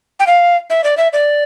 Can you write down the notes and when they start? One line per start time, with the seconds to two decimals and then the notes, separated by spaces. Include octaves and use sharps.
0.20 G5
0.27 F5
0.70 E5
0.84 D5
0.97 E5
1.13 D5